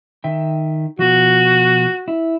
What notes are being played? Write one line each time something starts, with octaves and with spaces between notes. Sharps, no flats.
D#3 E5 G5
B2 F3 F#4
E4